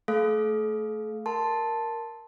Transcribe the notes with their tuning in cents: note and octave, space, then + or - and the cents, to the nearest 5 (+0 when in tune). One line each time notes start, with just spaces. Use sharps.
A3 +0 A4 -45 F5 +0
A#4 +0 A5 +0 C6 +0